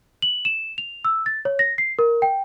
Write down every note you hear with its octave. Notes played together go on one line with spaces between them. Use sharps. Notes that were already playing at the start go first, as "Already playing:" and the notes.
F#7
E7
F7
E6
A6
C#5
A#6
C7
A#4
G5